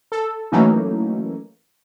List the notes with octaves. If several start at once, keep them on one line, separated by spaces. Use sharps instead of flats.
A4
E3 F#3 A3 A#3 C#4 D#4